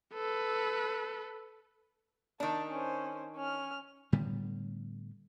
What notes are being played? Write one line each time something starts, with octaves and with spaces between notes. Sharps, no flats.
A4 B4
D#3 D4 A5
C#4 C5
C#4 F6
A2 D3 G3 B3